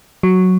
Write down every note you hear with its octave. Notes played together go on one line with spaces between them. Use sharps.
F#3